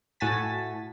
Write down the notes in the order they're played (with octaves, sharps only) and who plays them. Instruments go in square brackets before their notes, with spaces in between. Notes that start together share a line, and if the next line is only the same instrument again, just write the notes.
[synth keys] A2 F#4 G#5 A5 A6 B6